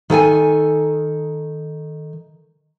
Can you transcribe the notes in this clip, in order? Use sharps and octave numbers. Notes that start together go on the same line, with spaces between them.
D#3 A4 G5 G#5